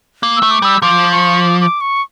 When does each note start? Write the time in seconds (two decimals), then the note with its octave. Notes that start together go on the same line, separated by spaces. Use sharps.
0.23 A#3
0.37 E6
0.43 A3
0.51 D6
0.62 G3 E6
0.82 F3 D6
1.12 C#6
1.41 D6
1.61 D6
1.81 C#6